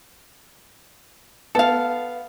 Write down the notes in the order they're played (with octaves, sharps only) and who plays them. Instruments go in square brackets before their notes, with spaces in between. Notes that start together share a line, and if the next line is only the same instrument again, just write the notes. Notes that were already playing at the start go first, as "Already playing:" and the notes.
[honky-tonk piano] B3 [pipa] A4 F5